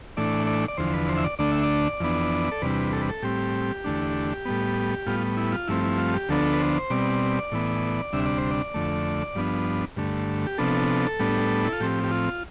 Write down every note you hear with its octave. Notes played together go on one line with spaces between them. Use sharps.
A2 E3 A3 D4 D5
D5
D5
E2 D3 F3 C5
B4
C5
E5
D5
D2 D3 A3 D4 D5
E5
D5
F2 E3 B3 D4
A4
E2 C3 G3 D4 B4
A4
B4
A4
A2 G3 C4 G4
E2 D3 A3 D4
A2 G3 B3
A2 G3 B3 F4
E4
F4
G2 F3 A3 C4 E4
E4
F4
G4
D2 D3 F3 B3 D4 A4
B4
C5
B2 G3 C4 D5
A2 E3 B3
D2 C3 G3 D4 E5
D5
C5
D5
F2 D3 A3
G2 F3 B3 D4
G2 D3 A3
G4
C3 F3 B3 D4 A4
A2 G3 B3 D4
E4
F4
A2 F3 C4 G4
G4
F4